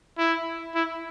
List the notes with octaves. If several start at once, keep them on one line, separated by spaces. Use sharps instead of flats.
E4
E4